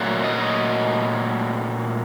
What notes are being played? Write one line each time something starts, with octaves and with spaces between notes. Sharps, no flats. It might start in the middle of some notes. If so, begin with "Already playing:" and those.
Already playing: A#2 F#3 A3
D#5